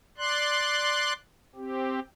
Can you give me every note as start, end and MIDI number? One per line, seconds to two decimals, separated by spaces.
0.18 1.13 74
0.18 1.13 84
0.18 1.13 90
1.55 2.00 60
1.55 2.00 67